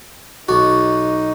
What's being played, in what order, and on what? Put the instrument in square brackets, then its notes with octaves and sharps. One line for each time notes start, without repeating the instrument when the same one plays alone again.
[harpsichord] B1 F#4 [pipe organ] D#4